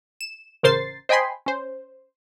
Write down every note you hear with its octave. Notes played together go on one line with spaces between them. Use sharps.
E7
A1 C#3 A#4 C5 A6 C7
C5 D#5 G5 G#5 B5 C6
C#4 C5